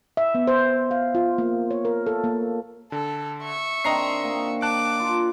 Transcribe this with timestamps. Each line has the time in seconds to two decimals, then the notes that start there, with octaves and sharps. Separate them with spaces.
0.17 E5
0.35 B3
0.47 C5
0.91 F5
1.15 F4
1.38 A#3
1.71 C#5
1.85 A#4
2.07 A4
2.24 A#3
2.92 D3 A4
3.43 E5 C#6
3.85 D#3 C4 D4 D#5 A#5 C7
4.24 A#3
4.62 A5 D6 F#6
5.00 F4